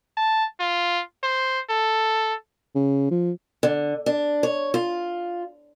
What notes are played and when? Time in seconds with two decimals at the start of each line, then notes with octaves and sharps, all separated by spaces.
0.17 A5
0.60 F4
1.23 C5
1.70 A4
2.75 C#3
3.11 F3
3.63 D3
4.06 D4
4.43 C#5
4.74 F4